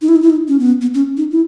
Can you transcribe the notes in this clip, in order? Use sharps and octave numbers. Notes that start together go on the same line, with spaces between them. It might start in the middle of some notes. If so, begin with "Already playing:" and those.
D#4
E4
D#4
E4
D#4
C#4
B3
B3
C#4
D#4
E4